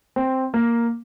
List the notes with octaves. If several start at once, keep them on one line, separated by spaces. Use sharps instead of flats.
C4
A#3